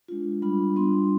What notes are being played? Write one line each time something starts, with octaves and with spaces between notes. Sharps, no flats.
G#3 D4 F4
G3 D4 F4 B5
G3 B3 D4 F4 C6